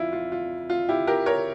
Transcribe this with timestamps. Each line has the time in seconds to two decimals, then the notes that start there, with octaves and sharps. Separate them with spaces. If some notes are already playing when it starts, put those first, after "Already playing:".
Already playing: F2 E4 F4
0.12 F4
0.32 F4
0.70 F4
0.89 E4 G4
1.07 G4 A#4
1.26 A#4 C#5